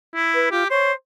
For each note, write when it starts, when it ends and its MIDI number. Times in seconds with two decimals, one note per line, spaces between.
0.15 0.51 64
0.34 0.49 71
0.51 0.64 65
0.51 0.69 67
0.70 0.93 72
0.70 0.92 73